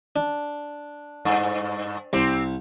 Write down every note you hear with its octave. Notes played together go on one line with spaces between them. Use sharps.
D4
G2
C2 C4 G4